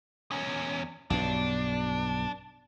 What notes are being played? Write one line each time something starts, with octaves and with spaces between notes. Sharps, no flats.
E2 C#4
B1 G2 B2 D4